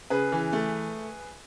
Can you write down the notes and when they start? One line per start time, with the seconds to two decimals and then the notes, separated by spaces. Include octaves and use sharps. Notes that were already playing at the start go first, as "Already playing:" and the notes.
0.10 C#3 G#4 B4
0.32 E3
0.52 A3